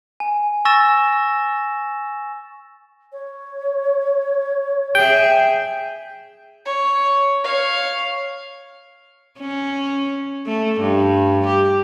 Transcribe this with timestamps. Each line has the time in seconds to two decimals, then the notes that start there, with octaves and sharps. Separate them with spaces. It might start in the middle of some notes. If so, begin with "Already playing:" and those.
0.20 G#5
0.65 G#5 C#6 E6 A6 A#6 E7
3.12 C#5
4.95 G#4 E5 G5
6.65 C#5
7.44 C#5 F5
9.39 C#4
10.46 A3
10.81 G2
11.46 G4